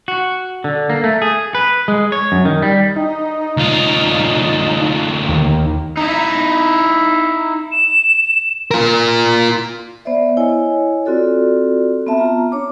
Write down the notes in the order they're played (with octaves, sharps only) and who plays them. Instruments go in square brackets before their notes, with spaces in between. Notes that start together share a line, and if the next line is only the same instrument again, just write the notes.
[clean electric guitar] F#4
D3
A#3
A3
G#4
B4
G#3
C#5
F#2
D#3
G3
[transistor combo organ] D#4
[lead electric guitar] D2 F4
[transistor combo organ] D#2
[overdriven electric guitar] D#4 E4
[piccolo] E7
[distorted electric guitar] F4 A#4
[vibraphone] B3 C5 D5 E5
E4 C#5 D#5 G#5
C4 F4 F#4 A4 D5
B3 C4 E5 A5
F4 A#5
D4 C#5 D6